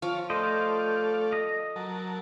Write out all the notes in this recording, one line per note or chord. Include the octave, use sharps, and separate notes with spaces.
F3 F4 C#5 F5 D6
A3 A4 C5 D5 D#5 F5
D#5
F#3 A#4 A5